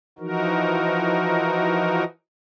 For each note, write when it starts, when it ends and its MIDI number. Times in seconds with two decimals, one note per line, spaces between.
0.19 2.04 52
0.19 2.04 53
0.19 2.04 63
0.19 2.04 66
0.19 2.04 70